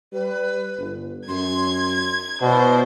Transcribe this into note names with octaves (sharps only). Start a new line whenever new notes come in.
G3 B4
G1
F#2 C6 G#6
B2 B3 E4 C5 D5